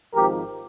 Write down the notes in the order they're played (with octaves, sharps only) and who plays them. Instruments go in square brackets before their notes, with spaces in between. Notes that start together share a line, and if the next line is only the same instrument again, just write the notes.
[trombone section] G#1 G#2 F3 G4 A#4